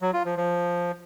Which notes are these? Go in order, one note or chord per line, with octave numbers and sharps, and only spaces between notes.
F#3
F4
F3
F3